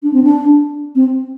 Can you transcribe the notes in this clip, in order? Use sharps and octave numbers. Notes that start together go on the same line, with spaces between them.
D4
C4
D4
C4